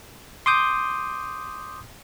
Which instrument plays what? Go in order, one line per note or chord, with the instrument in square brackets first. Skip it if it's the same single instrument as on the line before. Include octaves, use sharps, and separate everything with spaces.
[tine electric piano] C6 D6 D#6 G6